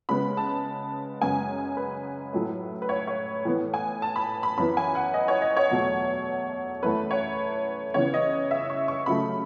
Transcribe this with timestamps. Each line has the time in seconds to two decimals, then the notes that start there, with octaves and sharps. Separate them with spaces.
0.09 C#3 G#3 B3 B5
0.37 A5
1.21 F#2 C#3 G#3 B3 G#5
1.77 B4
2.33 A2 F#3 A3
2.82 B4
2.89 C#5
3.07 C#5
3.45 A2 E3 B3
3.74 G#5
4.02 A5
4.16 B5
4.43 B5
4.57 F#2 E3 B3 B5
4.77 G#5
4.95 F#5
5.14 D#5
5.28 C#5
5.42 D#5
5.57 C#5
5.71 E2 B2 F#3 A3
6.83 F#2 E3 A3 B4
7.11 C#5
7.94 C#3 E3 B3 C#5
8.14 D#5
8.51 E5
8.70 C#6
8.88 C#6
9.06 C#3 F#3 A3 B5